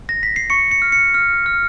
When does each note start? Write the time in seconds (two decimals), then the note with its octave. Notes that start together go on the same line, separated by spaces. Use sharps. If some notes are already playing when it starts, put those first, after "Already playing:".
0.09 A#6
0.23 B6
0.36 C7
0.50 C#6 C#7
0.71 C#7
0.82 F6
0.92 C#7
1.14 F6
1.46 F6